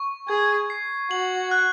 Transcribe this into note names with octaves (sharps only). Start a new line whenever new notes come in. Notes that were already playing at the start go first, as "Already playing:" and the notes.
Already playing: C#6
G#4 G#6
C7
F#4 F#7
F#6